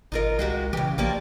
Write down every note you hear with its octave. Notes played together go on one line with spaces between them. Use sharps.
G#1 D#4 F4 A#4
C2 G#3 F#4 G4
C#3 E3 G4
A#1 F3 G3 A#3